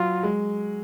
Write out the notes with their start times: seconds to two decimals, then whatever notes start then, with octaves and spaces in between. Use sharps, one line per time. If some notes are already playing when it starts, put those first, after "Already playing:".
Already playing: F#3 F4
0.23 G#3